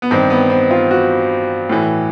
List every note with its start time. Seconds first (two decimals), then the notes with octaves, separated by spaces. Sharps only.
0.02 B3
0.11 G2 D#3 C4
0.30 B3
0.50 C4
0.71 F4
0.91 F#4
1.69 A2 E3